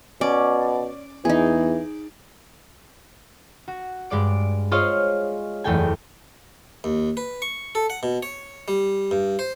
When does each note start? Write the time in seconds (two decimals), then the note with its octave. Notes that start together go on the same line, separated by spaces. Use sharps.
0.21 B2 C#4 D5
1.25 E2 E3 D#4 G#4
3.68 F#4
4.10 G2 G#3 D5 D7
4.71 F4 G#4 C5 C#5 D#5 F5
5.64 F#1 E2 A3 A4 G5 G#5
6.84 D#2
7.17 B4
7.42 C#6
7.75 A4
7.90 F#5
8.03 B2
8.23 C#5
8.68 G3
9.11 G2
9.39 C5